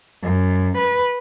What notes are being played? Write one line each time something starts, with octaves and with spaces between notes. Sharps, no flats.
F#2
B4